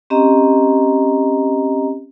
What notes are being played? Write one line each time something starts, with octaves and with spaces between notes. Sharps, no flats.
C4 C#4 G4 D#5 A#5